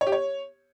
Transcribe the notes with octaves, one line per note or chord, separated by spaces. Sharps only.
C#5
G4
C#5